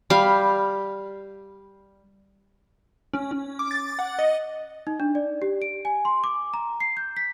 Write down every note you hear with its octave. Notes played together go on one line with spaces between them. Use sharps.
G3 F5 B5
C#4
C#4
D6
A6
F#5
D#5
D#4
D4
D5
G4
D7
G#5
C6
D6
A#5
C7
G6
B6